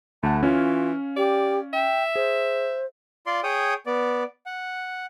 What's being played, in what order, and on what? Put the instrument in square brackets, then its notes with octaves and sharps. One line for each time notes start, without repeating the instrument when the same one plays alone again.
[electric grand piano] D2 F#5 [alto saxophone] A3 [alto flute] A5
[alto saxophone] E3 [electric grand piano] C#4 C#5 F5 [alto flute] F4
[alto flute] G4 [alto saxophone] D5
[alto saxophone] E5 [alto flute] G5
[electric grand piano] G#4 [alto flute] C5
[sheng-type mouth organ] F4 D5 C6
G#4 C#5 G5 D#6
B3 D5
F#5